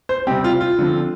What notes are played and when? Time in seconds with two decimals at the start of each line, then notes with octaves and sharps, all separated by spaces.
0.09 C5
0.27 C3 G3 C4 G4
0.44 F4
0.61 F4
0.78 D3 F3 C4